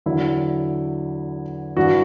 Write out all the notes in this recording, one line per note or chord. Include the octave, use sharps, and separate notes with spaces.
E2 D3 F#3 E4
G2 E3 F#4